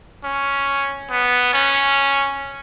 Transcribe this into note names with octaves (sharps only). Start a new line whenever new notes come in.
C#4
B3
C#4